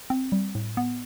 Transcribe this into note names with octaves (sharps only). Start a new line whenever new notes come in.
C4
G3
A2
B3